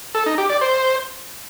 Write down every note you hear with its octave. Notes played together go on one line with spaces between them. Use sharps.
A4
D#4
G4
D5
C5